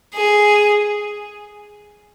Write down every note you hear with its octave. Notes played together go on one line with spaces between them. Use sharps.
G#4